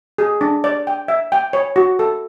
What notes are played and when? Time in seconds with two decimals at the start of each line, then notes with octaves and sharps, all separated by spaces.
0.18 G#4
0.41 D4
0.64 D5
0.87 G5
1.08 E5
1.32 G5
1.53 C#5
1.76 F#4
1.99 A4